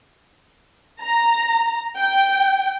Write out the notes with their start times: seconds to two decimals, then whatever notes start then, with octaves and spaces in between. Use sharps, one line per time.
1.03 A#5
1.99 G5